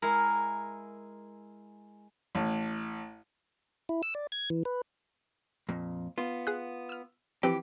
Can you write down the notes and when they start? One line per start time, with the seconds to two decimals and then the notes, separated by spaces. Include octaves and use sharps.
0.02 G#3 E4 A#4
2.35 A1
3.89 E4
4.03 E6
4.15 D5
4.32 G#6
4.50 E3
4.65 B4
5.69 F2 A#2
6.18 B3 F4
6.47 G#4 D#6 F#6
6.89 E6 F6
7.43 E3 F3 C4 G4 B4